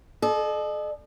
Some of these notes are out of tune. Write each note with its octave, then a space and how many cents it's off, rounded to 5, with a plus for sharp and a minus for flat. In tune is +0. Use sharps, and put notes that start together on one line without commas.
A4 -40 D#5 -45